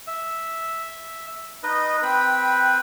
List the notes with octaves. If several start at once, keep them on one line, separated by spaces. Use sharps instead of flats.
E5
D#4 B4 D#5
C4 B4 G5 B5